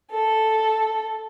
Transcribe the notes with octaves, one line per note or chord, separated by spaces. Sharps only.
A4